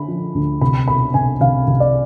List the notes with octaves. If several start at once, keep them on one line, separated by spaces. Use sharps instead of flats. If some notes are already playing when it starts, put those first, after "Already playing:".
Already playing: D3 B5
F3
D2
C2 B5
B2 B5
C2 G#5
C2 F5
C2
D5